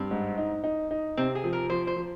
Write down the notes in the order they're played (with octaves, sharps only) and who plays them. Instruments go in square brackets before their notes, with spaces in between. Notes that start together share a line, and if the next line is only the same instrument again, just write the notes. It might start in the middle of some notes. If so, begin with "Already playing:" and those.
Already playing: [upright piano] G2 [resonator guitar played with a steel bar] C4
[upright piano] G#2
D#4
D#4
D#4
[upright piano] C3 [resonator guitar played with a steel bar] C4
[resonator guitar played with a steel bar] G#4
[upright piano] F3
[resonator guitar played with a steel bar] A#4
[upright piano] F3 [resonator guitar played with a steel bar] C5
[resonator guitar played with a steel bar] C5
[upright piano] F3